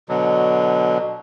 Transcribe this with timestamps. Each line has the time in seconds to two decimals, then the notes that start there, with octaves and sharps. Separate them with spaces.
0.09 B2 D3 F#3